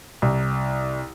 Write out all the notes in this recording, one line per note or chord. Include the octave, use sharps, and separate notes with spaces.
C2